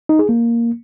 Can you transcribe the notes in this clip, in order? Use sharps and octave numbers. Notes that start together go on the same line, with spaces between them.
D#4
G#4
A#3